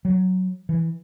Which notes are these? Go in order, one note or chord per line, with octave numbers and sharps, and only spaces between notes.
F#3
E3